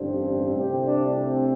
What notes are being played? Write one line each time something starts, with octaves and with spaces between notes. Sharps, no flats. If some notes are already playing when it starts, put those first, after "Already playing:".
Already playing: A1 G2 D3 C4
C2 C3 A3 C4 G4
D4
C4